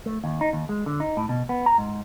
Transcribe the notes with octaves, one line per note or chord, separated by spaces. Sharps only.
A3
D#2
D#4
D#2
G#3
D3
D#4
A2
B2
B3
A#5
G#2